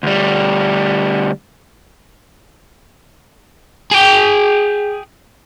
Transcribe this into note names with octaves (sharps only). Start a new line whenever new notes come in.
D2 G3
G#4 G5